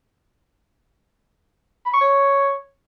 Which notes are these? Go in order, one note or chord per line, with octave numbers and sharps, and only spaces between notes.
B5
C#6
C#5